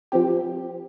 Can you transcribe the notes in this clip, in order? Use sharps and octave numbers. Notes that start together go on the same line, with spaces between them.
F3 C4 G4